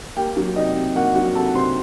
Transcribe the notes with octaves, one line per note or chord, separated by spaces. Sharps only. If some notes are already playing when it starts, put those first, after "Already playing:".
A#3 G4 G5
F#3
C3 D#4 D#5
C3
A#3 F#4 F#5
F#3 F#4 F#5
C3 A4 A5
C3 C5 C6